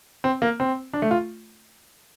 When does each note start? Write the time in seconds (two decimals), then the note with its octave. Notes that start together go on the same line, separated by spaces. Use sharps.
0.24 C4
0.42 A#3
0.60 C4
0.93 D4
1.02 A3
1.11 F4